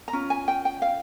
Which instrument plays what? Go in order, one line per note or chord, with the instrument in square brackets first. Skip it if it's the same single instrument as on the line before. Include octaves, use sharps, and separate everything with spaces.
[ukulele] A#5
C#4 F4
G#5
G5
G5
F5